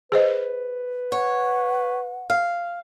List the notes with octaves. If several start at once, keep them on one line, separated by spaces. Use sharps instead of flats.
G#4 B4 C5 D#5
C#5 F#5
F5